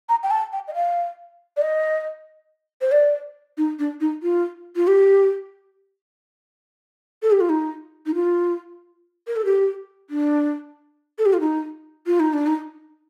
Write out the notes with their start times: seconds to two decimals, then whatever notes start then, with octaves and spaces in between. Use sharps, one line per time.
0.09 A#5
0.23 G5
0.31 A5
0.53 G5
0.68 D#5
0.75 F5
1.57 D5
1.61 D#5
2.81 C5
2.92 D5
3.58 D#4
3.79 D4
4.00 D#4
4.23 F4
4.76 F4
4.87 G4
7.23 A4
7.32 G4
7.41 F4
7.49 D#4
8.06 D#4
8.14 F4
9.27 A#4
9.36 A4
9.45 G4
10.10 D4
11.19 A4
11.26 G4
11.33 F4
11.40 D#4
12.06 F4
12.20 D#4
12.33 D4
12.47 D#4